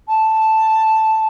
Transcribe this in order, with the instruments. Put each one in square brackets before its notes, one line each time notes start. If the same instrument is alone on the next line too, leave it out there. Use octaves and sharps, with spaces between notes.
[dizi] A5